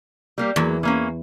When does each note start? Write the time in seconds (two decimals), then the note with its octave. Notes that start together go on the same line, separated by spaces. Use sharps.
0.38 G3 A#3 G4
0.56 E2 F#3 A#3
0.83 E3 A#3 C#4